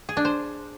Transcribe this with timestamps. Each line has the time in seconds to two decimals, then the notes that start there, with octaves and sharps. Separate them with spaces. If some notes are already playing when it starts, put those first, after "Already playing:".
0.09 G#4
0.17 D4
0.25 C5